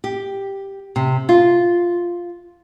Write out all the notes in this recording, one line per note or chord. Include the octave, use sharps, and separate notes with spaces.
G4
C3
F4